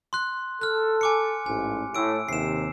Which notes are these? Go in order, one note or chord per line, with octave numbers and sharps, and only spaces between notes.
C6 F#6
A4 F6 F#6
G#5 D6 C#7
A1 G#2 G#5
A2 E6 D7
D#2 C3 C7 E7